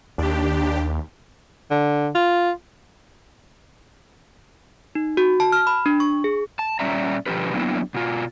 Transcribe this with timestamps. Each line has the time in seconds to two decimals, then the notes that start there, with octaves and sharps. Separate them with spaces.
0.18 D#2 D4 G4
1.71 D3
2.15 F4
4.95 D#4
5.17 F#4
5.40 A5
5.52 F6
5.67 B5
5.86 D4
6.00 C#6
6.24 G#4
6.59 A5
6.80 A#2 G3 C#4 D5 E5 A#5
7.26 B2 D3 F3 C4 G4 B4
7.53 F#3 A#3 B3 D4 E4
7.94 B2 F4